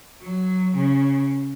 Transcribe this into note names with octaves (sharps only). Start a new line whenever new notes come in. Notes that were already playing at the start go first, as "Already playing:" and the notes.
F#3
C#3